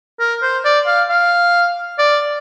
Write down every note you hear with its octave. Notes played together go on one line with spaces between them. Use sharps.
A#4
C5
D5
F5
F5
D5